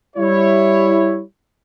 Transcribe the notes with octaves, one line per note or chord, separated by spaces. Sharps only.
G3 E4 C#5